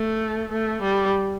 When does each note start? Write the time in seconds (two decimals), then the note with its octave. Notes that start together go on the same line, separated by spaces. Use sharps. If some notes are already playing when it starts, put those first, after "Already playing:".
Already playing: A3
0.52 A3
0.83 G3